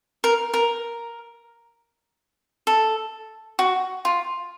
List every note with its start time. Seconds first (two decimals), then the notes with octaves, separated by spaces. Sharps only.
0.24 A#4
0.54 A#4
2.67 A4
3.59 F#4
4.05 F4